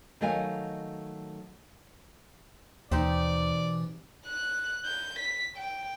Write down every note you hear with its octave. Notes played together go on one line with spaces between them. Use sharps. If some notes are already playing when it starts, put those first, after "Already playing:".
D#3 F#3 A3 D#5 F5 G#5
D#2 B2 E3 C4 D#4 G4 D5
F#6
G6
B6
G5